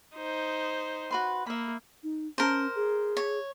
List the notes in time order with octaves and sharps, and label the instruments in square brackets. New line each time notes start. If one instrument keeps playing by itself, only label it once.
[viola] D#4 C5
[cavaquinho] F#4 B4 C6
[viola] A#3 [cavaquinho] E5 B5
[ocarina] D#4
[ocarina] C#4 [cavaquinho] A#4 C5
[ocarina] G#4
[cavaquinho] C#5